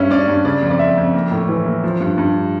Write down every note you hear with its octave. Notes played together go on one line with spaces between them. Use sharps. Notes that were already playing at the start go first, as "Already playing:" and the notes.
Already playing: G2 C#4 E5
C#4 D5
G2
C#3 D5
F2
D5
F2 E5
F2
A#3
A2
E3
A#3
F3
G2
G2